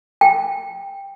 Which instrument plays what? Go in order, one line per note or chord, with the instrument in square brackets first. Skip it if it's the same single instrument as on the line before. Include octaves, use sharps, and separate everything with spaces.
[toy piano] G5